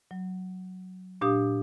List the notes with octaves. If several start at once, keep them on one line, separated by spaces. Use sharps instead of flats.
F#3
A#2 D4 G4 F5 D#6